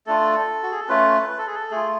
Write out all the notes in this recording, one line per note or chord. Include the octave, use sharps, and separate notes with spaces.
A3 D4 F4 A4
F#4
G#4
A4
A3 C#4 F4 B4
B4
A4
G#4
A4
A3 F4 G#4